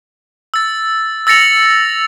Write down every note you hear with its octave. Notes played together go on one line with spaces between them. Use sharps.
E6 A6
E6 A6 A#6 C#7 F7 F#7